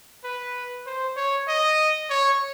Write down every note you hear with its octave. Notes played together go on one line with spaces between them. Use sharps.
B4
C5
C#5
D#5
C#5